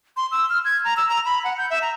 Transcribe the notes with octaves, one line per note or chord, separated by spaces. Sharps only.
C6
E6
F6
G#6
A#5
E6
A#5
B5
F#5
G6
E5
A#5